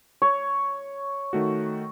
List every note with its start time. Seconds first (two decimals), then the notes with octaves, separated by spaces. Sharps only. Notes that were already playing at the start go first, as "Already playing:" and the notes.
0.22 C#5
1.33 D#3 A3 F#4